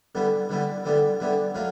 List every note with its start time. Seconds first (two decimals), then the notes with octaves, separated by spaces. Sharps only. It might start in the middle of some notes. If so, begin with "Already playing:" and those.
0.15 D3 G3 B3 E4
0.49 D3 G3 B3 E4
0.85 D3 G3 B3 E4
1.20 D3 G3 B3 E4
1.54 F#3 A3 C#4 F4